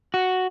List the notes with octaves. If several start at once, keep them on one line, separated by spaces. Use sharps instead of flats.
F#4